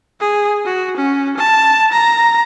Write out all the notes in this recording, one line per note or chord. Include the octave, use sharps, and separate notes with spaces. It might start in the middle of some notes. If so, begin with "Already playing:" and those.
G#4
F#4
C#4
A5
A#5